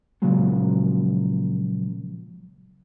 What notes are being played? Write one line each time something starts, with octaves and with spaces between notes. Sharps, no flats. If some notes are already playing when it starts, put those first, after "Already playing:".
A#2 C#3 F3 F#3 G#3